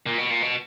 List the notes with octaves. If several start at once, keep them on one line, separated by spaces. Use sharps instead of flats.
A#2
B2
A#2
B2